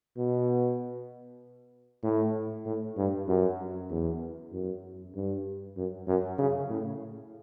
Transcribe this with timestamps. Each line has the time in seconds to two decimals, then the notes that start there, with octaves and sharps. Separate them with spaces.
0.17 B2
2.04 A2
2.66 A2
2.97 G2
3.28 F#2
3.91 E2
4.53 F#2
5.15 G2
5.77 F#2
6.08 F#2
6.39 C#3
6.69 A2